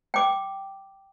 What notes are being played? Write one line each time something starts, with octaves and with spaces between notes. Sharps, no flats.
G5 D6